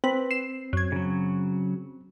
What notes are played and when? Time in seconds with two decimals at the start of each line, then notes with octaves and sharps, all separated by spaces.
0.04 C4 B4
0.31 C7 E7
0.73 F#2 G#6
0.92 C#3 F#3